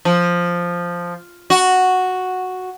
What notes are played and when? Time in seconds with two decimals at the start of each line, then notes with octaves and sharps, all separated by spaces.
0.05 F3
1.50 F#4